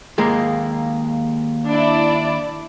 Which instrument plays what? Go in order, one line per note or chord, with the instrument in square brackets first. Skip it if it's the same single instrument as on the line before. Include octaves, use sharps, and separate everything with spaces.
[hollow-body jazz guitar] D#2 G#3 A#3
[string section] D4 E4 D5